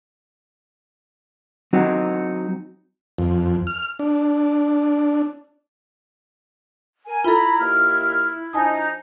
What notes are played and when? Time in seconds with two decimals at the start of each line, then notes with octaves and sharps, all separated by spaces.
1.73 F#3 C4 D#4 F#4
3.18 F2
3.67 F6
3.99 D4
7.06 A#4 G#5
7.25 E4 F4 A4 A#5 B5
7.59 D#2 A#3 F6
8.53 F3 D4 D#4 G#5 A5 D#6